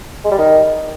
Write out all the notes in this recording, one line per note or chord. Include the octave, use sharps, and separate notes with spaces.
G#3
G3
D#3